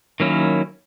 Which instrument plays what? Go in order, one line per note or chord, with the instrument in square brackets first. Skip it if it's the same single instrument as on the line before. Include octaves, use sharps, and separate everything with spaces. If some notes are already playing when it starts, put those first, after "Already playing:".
[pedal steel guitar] D#3 F#3 A#3 C#4 E4